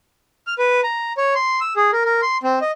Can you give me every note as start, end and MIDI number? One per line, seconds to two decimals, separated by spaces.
0.47 0.54 89
0.59 0.81 71
0.84 1.13 82
1.17 1.34 73
1.35 1.60 84
1.61 1.73 88
1.76 1.91 68
1.93 2.04 70
2.05 2.21 70
2.22 2.38 84
2.43 2.59 60
2.61 2.71 75